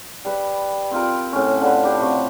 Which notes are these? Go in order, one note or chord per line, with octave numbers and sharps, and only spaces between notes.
G3 B4
C4 F4 A#4
A2 C#4
D3 B4
D4 G4
C3 C#6